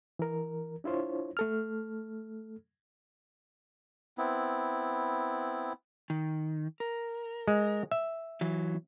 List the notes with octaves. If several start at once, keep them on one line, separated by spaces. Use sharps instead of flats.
E3 A#4
D4 E4 F4 C5 C#5
A3 A4 F6
B3 C4 E4
D#3
A#4
G#3
E5
E3 F#3